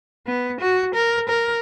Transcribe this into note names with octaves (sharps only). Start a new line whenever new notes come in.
B3
F#4
A#4
A#4